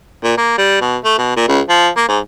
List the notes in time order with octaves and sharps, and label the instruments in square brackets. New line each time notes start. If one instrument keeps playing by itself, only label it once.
[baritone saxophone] A#2
A#3
G3
B2
A3
B2
A#2
C#2
F3
A#3
G#2